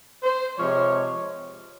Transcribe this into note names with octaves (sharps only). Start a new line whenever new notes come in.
C5
C3 F3 G#3 C#5